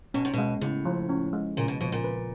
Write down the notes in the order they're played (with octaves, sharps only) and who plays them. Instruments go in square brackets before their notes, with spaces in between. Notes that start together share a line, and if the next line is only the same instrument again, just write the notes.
[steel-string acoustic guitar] B2 [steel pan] C#4
[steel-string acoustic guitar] C3
[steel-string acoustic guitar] B2 [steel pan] G#3
[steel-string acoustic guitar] A2 [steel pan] C#3
[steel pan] F3
C#4
G#3
[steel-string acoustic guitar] A#2 [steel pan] C#3
[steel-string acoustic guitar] B2
[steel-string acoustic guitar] B2 [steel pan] F3
[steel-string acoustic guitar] A#2
[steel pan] B4